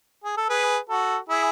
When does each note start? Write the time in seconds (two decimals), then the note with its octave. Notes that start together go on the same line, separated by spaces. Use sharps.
0.24 G#4
0.37 A4
0.50 G#4 B4
0.89 F#4 A4
1.29 E4 G#4